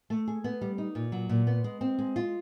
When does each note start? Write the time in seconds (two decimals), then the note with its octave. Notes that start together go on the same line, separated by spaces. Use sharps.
0.10 A3
0.27 G#4
0.44 B3
0.61 G3
0.78 D#4
0.95 A#2
1.12 F#3
1.29 A#2
1.47 B3
1.64 G#3
1.81 C4
1.99 G#3
2.16 F4